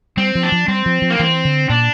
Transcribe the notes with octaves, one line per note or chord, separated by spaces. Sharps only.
G3 C4
F3
D4
F3
G3 C4
F3
F3
A#3
E3 C4
D3
A#2 D4